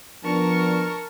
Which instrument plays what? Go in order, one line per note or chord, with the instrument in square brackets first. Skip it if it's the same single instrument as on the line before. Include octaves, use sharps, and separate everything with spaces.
[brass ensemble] F3 B3 D4 [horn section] A#4 [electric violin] A5 C#6